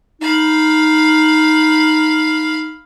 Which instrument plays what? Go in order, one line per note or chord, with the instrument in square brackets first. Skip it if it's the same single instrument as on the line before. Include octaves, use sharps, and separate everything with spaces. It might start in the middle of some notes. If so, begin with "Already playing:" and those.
[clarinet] D#4 [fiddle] F5 B5